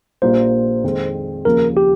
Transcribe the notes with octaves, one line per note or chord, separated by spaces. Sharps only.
A#1 A#2 G3 A#3 F4 C5
F2 D#3 G#3 C4
D#2 C#3 F3 A#4
G4